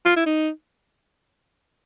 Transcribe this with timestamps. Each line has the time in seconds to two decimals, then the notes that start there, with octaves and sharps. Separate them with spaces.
0.06 F4
0.17 E4
0.26 D#4